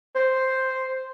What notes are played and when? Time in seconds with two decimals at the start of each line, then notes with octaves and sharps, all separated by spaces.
0.15 C5